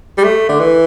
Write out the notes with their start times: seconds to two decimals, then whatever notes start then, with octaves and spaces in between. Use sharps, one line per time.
0.18 G3
0.24 A3
0.49 D3
0.60 E3